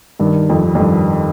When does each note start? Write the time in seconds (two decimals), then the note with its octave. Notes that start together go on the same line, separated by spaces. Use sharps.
0.20 G2 D#3
0.50 F2
0.65 D#3
0.75 F2
0.80 G2